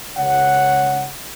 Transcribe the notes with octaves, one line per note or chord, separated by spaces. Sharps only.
C#2 C#5 F#5